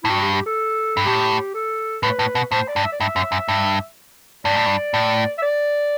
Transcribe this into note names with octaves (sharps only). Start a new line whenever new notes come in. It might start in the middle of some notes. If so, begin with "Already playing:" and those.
A2 E4
G2 F#4
G4
G4
A4
G2
A2 G4
A4
A2 B4
A2
B2
A2 C5
D5
G2
E5
D5
G2 E5
F#2
F#2
G2
G2 D5
A2
G2
A2
E5
D5